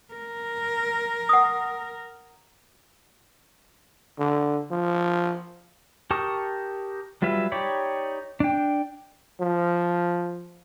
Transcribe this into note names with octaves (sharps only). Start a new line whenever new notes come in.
A#4
F#5 D#6
D3
F3
G4 A#4 A5 C#6 D#6
F#3 G3 F4 B4 E5
D#4 G4 C#5 D5 B5
D4 G5
F3